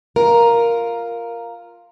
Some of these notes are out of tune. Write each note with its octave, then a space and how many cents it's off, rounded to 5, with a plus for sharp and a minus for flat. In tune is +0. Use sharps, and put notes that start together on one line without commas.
F4 +0 A#4 +0